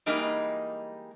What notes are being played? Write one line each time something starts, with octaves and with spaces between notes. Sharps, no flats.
E3 G3 G#3 A#3 D#4